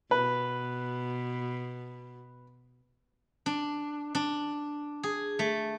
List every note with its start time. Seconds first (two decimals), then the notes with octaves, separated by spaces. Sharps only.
0.11 B2 B4
3.46 D4
4.15 D4
5.03 G#4
5.39 A3